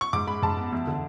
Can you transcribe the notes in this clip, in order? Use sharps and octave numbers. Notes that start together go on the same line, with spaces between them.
C#6
G#2 D6
G#3 B5
G#2 A5
B3
E2
D3